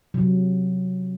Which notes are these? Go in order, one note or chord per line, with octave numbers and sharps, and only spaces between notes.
C3 F#3